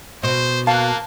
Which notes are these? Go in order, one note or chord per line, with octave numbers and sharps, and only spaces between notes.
B2 C5
A#3 F5 A5 F#6